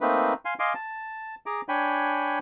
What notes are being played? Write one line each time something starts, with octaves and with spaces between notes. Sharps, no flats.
A3 A#3 C4 D#4 B4
F5 G#5 C6
D#5 F5 G#5 C6 D6
A5
G#4 A#5 D6
D4 C#5 G5 G#5 B5